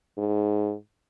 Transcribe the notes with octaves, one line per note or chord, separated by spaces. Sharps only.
G#2